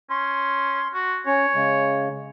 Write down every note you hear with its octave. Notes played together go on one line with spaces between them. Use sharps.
C#4 C6
F#4
C#4 C#5
C#3 G#3